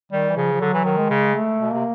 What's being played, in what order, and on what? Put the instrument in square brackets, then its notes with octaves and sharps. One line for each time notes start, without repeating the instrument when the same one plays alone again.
[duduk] D#3 [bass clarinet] G3
[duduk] E3
[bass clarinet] C#3 [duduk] F3
[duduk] F3
[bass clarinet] D3 [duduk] F#3
[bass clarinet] E3
D#3
[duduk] G#3
[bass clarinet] C#3
[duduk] A3
[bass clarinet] B2
[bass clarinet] C3 [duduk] A#3